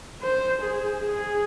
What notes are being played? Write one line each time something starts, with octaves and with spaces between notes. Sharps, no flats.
C5
G#4
G#4